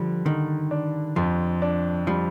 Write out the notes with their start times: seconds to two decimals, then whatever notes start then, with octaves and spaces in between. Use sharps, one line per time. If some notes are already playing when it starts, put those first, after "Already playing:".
Already playing: D3 F3 G3
0.25 D3 D#3
0.71 D4
1.16 F2 F3
1.62 D4
2.07 F3 G3